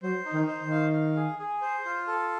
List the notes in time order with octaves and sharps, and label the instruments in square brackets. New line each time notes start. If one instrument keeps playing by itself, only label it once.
[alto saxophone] F#3 [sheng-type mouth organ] C5
[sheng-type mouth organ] D#4
[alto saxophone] D#3
[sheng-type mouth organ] C5
[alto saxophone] D#3
[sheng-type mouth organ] F5
F5
G#4
G#4
C5
F4
A4